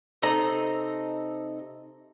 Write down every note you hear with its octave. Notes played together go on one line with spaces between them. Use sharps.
C3 C4 D#4 A4 D#5 A#5